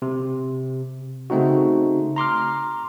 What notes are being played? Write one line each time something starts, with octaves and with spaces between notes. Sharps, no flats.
C3
C#3 A3 C4 D#4 F#4
A#5 C6 D6 F6